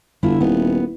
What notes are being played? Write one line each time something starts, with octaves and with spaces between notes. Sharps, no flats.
G1 D3 E4 F4
D#1 B3